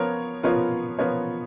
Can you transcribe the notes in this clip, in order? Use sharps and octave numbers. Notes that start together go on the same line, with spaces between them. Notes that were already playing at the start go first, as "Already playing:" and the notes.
Already playing: F3 B3 F4 A#4 C#5
F3 B3 F4 A#4 C#5
F3 B3 F4 A#4 C#5